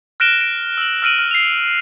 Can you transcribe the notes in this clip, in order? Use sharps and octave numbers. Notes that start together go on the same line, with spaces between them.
F6 F#6 A#6 D7 E7 G7
D7
E6 F#7
E6 F6 A#6 D7 D#7 F#7
F6
C7 F7